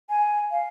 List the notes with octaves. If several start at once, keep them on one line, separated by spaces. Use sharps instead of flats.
G#5
F5